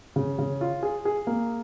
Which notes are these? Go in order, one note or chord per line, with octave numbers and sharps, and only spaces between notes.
C#3
C#3
F4
G#4
G#4
A#3